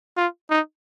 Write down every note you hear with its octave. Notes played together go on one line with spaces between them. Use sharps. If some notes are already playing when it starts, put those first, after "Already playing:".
F4
D#4